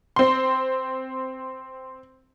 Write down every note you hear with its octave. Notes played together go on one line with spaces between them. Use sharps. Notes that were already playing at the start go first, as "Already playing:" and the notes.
C4 C6